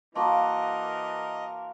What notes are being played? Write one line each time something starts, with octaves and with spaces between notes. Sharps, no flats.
E3 A#3 F#4 A#4 D#5 A5 C6 D6